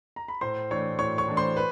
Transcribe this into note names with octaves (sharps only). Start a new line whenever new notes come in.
A#5
B5
A2 C5 C6
E3 A3 D4 C#5 C#6
A2 C#5 C#6
C#5 C#6
E3 A3 D4
C5 C6
B4